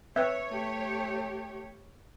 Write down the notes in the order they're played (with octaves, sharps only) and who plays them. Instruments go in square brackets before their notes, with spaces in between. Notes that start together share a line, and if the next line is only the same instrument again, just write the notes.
[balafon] C4 B4 G5 [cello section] C#5 [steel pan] E5
[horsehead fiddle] A3 G4